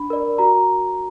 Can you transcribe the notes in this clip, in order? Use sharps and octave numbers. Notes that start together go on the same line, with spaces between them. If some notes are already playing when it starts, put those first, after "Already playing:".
Already playing: D4 B5
A#4 D5
F#4 A#5